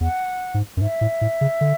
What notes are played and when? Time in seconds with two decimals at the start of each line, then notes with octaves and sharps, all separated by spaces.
0.01 E2 F#5
0.54 G#2
0.77 F#2
0.81 G#2 E5
1.01 A2
1.21 A2
1.41 C#3
1.61 D3